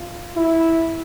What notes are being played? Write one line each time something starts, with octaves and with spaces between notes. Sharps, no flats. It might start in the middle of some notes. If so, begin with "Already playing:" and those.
Already playing: F4
E4